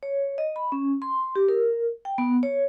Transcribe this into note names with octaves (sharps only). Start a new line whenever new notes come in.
C#5
D#5
B5
C#4
C6
G4
A#4
G5
B3
C#5